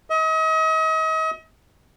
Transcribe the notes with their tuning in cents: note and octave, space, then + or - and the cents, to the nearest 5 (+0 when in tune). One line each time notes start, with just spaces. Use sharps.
D#5 +40